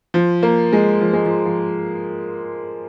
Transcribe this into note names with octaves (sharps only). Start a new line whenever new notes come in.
F3
A#3
G#3
F3
G#3
F3
F3